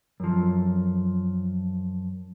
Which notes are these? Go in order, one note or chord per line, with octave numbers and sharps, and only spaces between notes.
F#2 F3